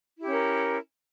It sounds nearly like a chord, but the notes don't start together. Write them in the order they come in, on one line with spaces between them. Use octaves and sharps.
E4 G4 C#4 A#4